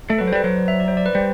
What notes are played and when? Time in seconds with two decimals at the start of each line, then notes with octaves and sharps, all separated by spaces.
0.09 A3 A4
0.18 F#3 B4
0.27 C5
0.32 G3 B4
0.44 F#3 C5
0.56 D5
0.68 E5
0.80 D5
0.88 C5
0.97 D5
1.06 B4
1.15 G3 C5